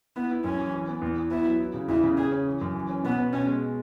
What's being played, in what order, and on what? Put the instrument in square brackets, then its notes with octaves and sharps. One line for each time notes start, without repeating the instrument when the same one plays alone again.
[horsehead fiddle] B3 [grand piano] E4
[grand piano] E4
[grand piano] F#2 [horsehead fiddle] C#4
[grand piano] E3
E3
B3
E2
E2
[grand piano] B3 [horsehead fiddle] E4
[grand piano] F#3
E4
C#3
[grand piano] E2 [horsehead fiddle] E4
[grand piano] C#3
[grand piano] C#3 [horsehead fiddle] G#4
[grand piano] C#4
E3
F#2
E3
C#4
[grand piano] B2 [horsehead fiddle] B3
[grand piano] B3
[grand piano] B2 [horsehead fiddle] C#4
[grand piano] G#3